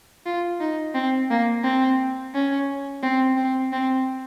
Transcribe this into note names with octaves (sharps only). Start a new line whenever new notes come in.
F4
D#4
C4
A#3
C4
C#4
C4
C4
C4